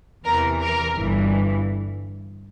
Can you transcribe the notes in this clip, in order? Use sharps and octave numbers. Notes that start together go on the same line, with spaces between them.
E2 C3 E3 A#4
A#4
G1 G2 E3